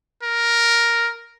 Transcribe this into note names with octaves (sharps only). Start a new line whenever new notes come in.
A#4